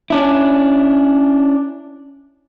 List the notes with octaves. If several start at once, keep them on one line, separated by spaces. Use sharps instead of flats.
C#4 D4 E4